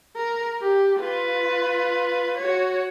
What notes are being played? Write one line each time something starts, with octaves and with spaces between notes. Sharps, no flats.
A#4
G4
F4 B4
F#4 C#5